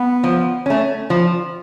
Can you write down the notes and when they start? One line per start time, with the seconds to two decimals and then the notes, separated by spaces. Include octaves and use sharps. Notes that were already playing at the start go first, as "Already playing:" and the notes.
Already playing: B3
0.24 F3
0.66 A3 C#4
1.10 F3